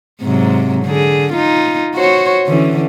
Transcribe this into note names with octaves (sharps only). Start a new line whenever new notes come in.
G#2 C3 F#3
D3 G#4
D#4 F4
F#4 C5 C#5
D3 E3 C#4